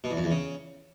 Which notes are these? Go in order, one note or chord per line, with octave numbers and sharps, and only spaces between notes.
B2
E2
F2
E2
C#3